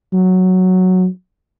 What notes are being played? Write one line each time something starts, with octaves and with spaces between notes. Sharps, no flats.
F#3